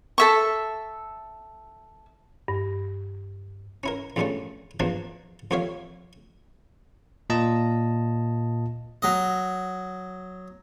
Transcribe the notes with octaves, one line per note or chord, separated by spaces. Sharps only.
A4 E5 C#6
G2
C#4 E4 A#4
E2 G2 A#2 G3 A3 C#4
E2 B2 E3 F3 A#3 D4
F2 A#2 G4 C#5 E5 F5
A#2 F4 D#5 A5
F#3 D#5